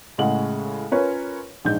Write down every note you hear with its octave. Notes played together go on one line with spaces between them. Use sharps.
A2 C#3 G#3 F#5 F#7
C#4 F4 A#4 B4 C#5
A#1 G#2 G6